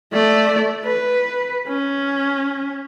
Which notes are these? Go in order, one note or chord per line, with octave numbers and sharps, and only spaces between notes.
A3 D5
B4
C#4